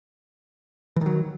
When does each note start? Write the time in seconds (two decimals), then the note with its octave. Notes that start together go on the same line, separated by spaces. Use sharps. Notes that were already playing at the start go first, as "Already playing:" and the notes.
0.96 E3
1.01 D#3
1.06 F#3